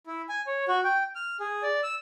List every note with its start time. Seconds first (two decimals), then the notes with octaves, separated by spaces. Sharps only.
0.07 E4
0.29 G#5
0.47 C#5
0.68 F#4
0.84 G5
1.15 F6
1.40 G#4
1.63 D5
1.83 E6